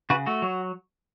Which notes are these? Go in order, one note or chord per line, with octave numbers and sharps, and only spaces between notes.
C#3 F#4 B4
A3 F#4
F#3